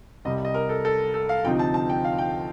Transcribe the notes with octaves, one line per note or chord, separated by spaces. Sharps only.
C2 C3 G3 D#5
D#5
A#4
A4
A4
A4
F5
D2 C3 F3 C4 D#4 G5
A5
A5
G5
F5
G5